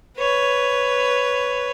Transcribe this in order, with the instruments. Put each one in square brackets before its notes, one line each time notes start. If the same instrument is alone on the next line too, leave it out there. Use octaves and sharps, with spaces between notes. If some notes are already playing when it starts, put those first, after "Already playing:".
[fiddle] B4 C#5